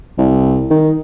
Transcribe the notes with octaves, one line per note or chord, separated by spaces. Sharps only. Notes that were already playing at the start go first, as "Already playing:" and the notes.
C2
D#3